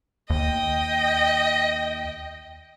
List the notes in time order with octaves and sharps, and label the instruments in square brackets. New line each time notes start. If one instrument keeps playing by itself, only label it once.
[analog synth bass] D#2 [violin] D#5 G5